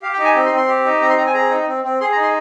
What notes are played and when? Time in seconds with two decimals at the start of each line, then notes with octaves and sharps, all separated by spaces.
0.02 G4 F5
0.13 G5
0.18 D#4
0.24 G#5
0.35 C4
0.46 C6
0.52 C4
0.57 C6
0.68 G4
0.85 D#4
1.01 C4 A#5
1.10 C6
1.18 C4 A#5
1.26 G#5
1.34 G#4 A#5
1.51 D#4
1.67 C4
1.84 C4
2.01 G#4 C6
2.12 A#5
2.17 D#4
2.23 C6